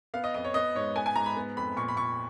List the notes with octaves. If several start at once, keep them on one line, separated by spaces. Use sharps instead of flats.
B3 F5
D#5
F2 D#5
C#5
B3 D#5
G#2 C#5
B3 G#5
G#5
G#2 A#5
B5
B3
F2 B5
A#2 C#6
B5
A#2 C#6